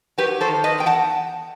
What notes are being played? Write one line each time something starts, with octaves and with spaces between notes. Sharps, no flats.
F#3 G4 B4
A4 C5
D#3
B4 D#5
E2 G5
F#5 A5